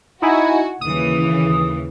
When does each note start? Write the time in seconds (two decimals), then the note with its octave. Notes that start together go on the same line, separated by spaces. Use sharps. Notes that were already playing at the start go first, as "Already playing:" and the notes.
0.22 D#4 E4 F#4 G#5
0.81 D#2 C#3 E3 D#6